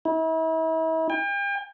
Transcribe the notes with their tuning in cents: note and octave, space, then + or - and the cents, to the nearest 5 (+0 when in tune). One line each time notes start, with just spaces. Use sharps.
E4 -40
G5 +40